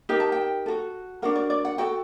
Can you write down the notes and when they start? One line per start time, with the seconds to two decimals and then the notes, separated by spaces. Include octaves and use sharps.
0.09 D#4 G4 A#4 G5
0.20 A5
0.32 G5
0.66 F#4 A4
1.22 D4 F#4 A#4 F#5
1.36 D5
1.50 D5
1.65 F#5
1.78 F#4 A4 G5